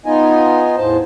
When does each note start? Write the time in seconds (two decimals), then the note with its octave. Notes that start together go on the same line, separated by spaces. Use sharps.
0.06 B3 D#4 F4 D#5 G#5
0.77 E2 A2 C5 A5